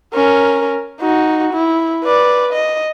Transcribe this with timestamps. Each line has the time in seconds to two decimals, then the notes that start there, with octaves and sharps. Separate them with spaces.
0.14 C#4 A#4
1.01 D#4 F#4
1.53 E4
2.04 B4 D5
2.53 D#5